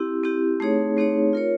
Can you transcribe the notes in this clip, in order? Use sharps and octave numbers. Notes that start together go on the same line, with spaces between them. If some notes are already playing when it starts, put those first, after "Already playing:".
Already playing: C4 E4 G4
C4 E4 G4
A3 C4 D#4 G#4 C#5
A3 C4 D#4 G#4 C#5
F4 A#4 C#5